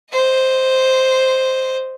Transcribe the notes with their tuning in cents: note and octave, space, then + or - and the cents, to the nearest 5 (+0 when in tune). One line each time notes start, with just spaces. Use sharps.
C5 +0 D#5 +0